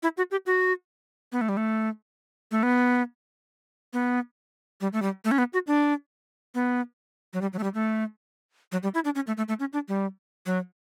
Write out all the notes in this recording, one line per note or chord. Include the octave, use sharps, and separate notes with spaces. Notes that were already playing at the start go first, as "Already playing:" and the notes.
E4
F#4
G4
F#4
B3
A3
G3
A3
A3
B3
B3
G3
A3
G3
A3
C#4
B3
F#4
D4
B3
F#3
G3
F#3
A3
G3
A3
F#3
G3
E4
D4
C#4
A3
A3
A3
C#4
D4
G3
F#3